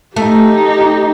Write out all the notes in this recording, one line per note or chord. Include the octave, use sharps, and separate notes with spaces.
A3 D#4 G4